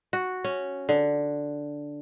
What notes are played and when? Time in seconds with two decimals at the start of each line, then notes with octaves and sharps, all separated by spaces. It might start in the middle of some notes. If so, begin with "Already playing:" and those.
0.13 F#4
0.44 C#4
0.89 D3